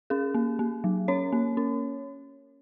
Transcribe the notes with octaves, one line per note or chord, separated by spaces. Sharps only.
C#4 G#4
A#3
A#3
F#3
C#4 C#5
A#3
C#4